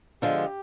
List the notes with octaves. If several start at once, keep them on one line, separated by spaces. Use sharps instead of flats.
D3 F3 G#3 G4